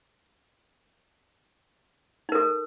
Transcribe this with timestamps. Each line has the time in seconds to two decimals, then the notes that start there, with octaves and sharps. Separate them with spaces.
2.29 D#4
2.32 A#4
2.35 A4